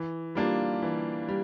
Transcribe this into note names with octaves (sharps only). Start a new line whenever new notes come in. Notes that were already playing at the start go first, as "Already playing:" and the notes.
Already playing: E3
G3 A#3 D4 F4
E3
G3